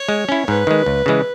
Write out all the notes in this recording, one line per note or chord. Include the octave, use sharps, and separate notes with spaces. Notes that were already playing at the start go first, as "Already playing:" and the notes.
Already playing: C#5
G#3
C#4 E4
G#2 B4
D#3 G#3
C#2
C#3 E3 G#3